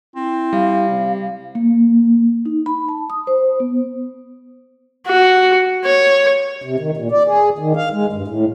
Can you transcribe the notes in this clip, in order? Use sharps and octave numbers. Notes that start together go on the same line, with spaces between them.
C4 E4
G3 F5
C3
A#3
D#4
B5
A5
D#6
C5
B3
F#4
C#5
C3
D#3
A#2
D5
G#4
D#3
F5
G#3
G2
A2